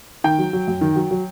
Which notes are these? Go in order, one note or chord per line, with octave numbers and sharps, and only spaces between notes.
D#3 G5
F#3
F#3
F#2
D#3
F#3
F#3